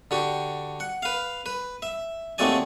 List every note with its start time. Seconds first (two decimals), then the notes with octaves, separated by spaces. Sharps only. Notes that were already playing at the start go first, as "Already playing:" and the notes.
0.11 D3 F#4 G4
0.80 F#5
1.02 B4 F5
1.46 B4
1.82 E5
2.38 D#2 A3 C4 F#4 D5 G#5